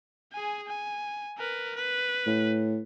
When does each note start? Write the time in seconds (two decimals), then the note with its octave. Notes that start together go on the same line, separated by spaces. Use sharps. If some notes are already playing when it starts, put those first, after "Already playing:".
0.32 G#4 G#5
0.67 G#5
1.38 A#4 B4
1.75 B4
2.26 A2